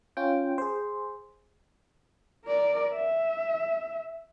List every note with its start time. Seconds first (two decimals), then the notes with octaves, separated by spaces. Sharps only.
0.17 C#4 F4 G5
0.58 G#4 C5
2.45 A#4 D5
2.93 E5